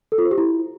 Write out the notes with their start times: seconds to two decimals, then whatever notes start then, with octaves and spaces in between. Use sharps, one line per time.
0.12 A4
0.18 F4
0.25 C5
0.31 G4
0.38 E4